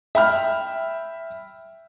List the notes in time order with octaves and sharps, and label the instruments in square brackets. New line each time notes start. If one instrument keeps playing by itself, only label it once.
[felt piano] E5 G5 B5 F6